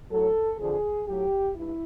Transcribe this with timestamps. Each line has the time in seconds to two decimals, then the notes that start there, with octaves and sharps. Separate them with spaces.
0.11 A2 F#3 A4
0.58 F2 D3 F3 G#4
1.07 A2 F#3 G4
1.55 G2 E4